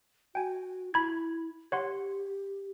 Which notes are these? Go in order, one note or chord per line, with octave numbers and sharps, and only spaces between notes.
F#4 G5 G#5
E4 B5 G#6
G4 C#5 F#5 C6